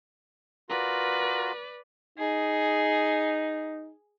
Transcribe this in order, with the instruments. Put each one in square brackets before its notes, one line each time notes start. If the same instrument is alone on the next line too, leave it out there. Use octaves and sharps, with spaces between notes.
[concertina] F4 F#4 A#4 [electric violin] B4 D5
[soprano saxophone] D#4 [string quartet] G#4